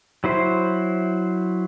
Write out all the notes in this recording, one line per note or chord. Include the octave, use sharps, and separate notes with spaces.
F#3 E4 C5